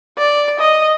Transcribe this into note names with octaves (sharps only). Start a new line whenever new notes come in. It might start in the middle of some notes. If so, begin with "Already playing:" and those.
D5
D#5